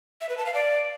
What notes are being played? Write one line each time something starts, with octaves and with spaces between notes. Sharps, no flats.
E5
B4
A5
F5
D5